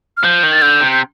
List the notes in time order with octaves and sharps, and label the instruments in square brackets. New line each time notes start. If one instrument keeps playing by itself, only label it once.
[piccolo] F6
[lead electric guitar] F3 [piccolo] G6
[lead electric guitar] D#3
[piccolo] A6
[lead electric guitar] D3 [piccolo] G6
[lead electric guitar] C3
[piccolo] G6